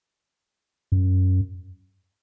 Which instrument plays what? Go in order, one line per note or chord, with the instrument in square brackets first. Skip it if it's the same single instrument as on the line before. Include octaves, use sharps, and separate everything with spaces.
[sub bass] F#2